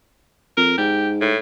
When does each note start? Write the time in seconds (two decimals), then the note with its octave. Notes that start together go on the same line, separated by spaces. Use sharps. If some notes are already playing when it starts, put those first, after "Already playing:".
0.57 F2 A#4
0.78 G#2 G4
1.21 A2